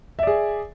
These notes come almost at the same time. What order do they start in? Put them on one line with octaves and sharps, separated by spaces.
E5 D5 G#4